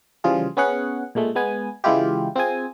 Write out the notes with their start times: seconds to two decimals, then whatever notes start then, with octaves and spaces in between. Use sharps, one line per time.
0.24 C#3 E3 F3 G3 F4 G#4
0.57 B3 C#4 G#4 F#5
1.15 A#2 G#3 A3
1.35 G#3 B3 G#5
1.84 C#3 E3 G#3 E4 F4 G4
2.36 C4 F4 G#4 G#5